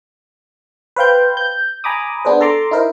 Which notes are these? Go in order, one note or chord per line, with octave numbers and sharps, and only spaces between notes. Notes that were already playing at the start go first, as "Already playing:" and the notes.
B4 C5 F5 G5 G6
G6
G#5 A#5 B5 D6 D#6
B3 D4 G#4 B4 C5
A4 A5 A#5 C6 D6
D#4 E4 A#4 C5 E5